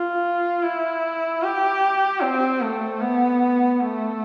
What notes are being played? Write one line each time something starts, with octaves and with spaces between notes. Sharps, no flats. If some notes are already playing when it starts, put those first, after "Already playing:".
Already playing: F4
E4
G4
C4
A3
B3
A3